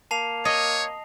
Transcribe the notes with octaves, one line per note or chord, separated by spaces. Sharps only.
A#3 A5 C7 F7
C#5 D#5